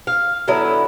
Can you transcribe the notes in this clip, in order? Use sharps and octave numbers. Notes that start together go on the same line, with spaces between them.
F5
D3 F#3 B3 E4